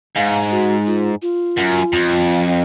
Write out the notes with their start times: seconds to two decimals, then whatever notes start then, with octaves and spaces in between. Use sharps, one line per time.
0.16 G#2 F5
0.51 F#4
0.87 F4
1.22 F4
1.57 F#2
1.93 F2